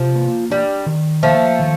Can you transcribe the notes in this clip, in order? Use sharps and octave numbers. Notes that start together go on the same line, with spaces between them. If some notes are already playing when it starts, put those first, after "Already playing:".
Already playing: C3 F3
A#3
G3 D4
D#3
F3 A3 A#3
D#3